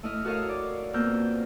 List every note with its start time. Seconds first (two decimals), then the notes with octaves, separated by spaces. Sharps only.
0.03 A3 E4 D#5 F6
0.25 F#4 A4 A#4 C#5 D#5 F5
0.49 D5
0.93 F2 B2 A#3 A#4 E6 G6